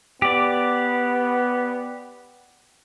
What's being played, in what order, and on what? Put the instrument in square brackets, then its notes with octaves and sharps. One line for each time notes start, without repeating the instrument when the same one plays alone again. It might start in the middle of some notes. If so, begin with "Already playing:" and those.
[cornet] B3 [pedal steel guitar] G4 D5